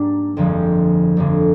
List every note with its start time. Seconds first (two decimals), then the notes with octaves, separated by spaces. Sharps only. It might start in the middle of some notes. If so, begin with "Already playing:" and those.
Already playing: G#2 G3 A#3 D4
0.37 G1 F2 D3 F3 G#3
1.17 G1 F2 D3